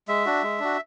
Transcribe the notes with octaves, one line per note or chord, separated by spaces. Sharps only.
G#3 E5
D4 F#4
G#3
D4 F#4